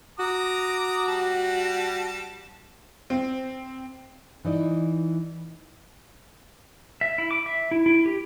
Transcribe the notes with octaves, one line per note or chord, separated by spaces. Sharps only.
F#4 A#5 D6 D#6
G3 A5
C4
E3 D#4 D5
E5
E4
D6
E5
E4
E4
G4